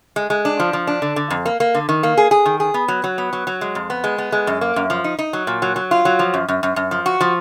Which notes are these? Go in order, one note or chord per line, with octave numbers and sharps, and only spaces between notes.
G#3
G#3
D4
F3
F3
D4
D3
D3
F2
A#3
A#3
D3
D#3
A#3
G#4
G#4
D#3
G#4
B3
F#3
F#3
B3
F#3
F#3
G#3
F2
B3
G#3
B3
G#3
F#2
A#3
F#2
F3
D#4
D#4
F#3
A#2
F#3
F#3
F4
F#3
F3
F#2
F#2
F#2
F#2
F3
F#4
F3